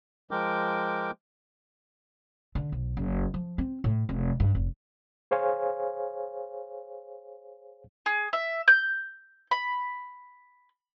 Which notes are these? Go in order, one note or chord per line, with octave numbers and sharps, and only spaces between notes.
F3 G#3 A#4 G5 D6
D3
B1
F#1
F3
C4
A2
F1
G2
F1
G#4 C5 C#5 F5 G#5
G#4
E5
G6
B5